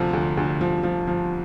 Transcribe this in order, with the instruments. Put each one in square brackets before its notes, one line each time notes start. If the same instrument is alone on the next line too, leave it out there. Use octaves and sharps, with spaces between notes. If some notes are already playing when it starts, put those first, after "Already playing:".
Already playing: [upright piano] D2 C3 F3
D2
D2
F3
F3
F3